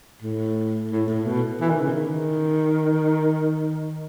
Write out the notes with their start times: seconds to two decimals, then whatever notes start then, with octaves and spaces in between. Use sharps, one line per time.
0.23 A2
0.92 A2
1.09 A2
1.26 B2
1.61 E3
1.70 D#3
1.80 C#3
1.90 D#3